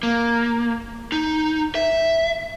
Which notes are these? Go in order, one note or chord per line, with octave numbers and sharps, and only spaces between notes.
A#3
D#4
E5